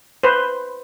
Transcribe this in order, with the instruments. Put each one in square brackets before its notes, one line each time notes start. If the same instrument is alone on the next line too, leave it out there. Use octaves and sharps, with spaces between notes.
[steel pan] B4 C5